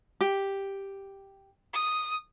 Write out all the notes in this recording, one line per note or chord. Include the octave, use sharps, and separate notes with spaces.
G4
D#6